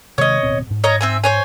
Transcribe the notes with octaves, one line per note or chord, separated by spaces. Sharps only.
C3 D#3 G#3 C#5 D#5
D1 B2 C4
G#2
C#5 D#5 A#5
C4 E5 G#5
C5 C#5 G#5